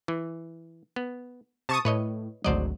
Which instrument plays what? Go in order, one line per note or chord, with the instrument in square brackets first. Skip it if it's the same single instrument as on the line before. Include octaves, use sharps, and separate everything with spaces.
[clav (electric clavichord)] E3
B3
[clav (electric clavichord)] C3 [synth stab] A5 C#6 D#6
[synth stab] A2 [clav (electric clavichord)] B4 C#5 D#5
[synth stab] G#1 D2 F#3 [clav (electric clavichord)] C5 D5 D#5